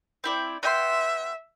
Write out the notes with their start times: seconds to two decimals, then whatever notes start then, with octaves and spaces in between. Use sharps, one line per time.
0.24 C4 E4 D5
0.63 B3 E5 G5 C6